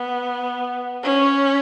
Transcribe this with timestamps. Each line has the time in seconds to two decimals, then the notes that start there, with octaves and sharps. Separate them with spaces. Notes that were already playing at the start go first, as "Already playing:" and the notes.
Already playing: B3
1.04 C#4